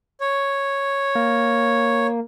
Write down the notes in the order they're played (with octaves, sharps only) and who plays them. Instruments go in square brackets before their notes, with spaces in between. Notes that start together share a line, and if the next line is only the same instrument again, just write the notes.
[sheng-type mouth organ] C#5
[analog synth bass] A#3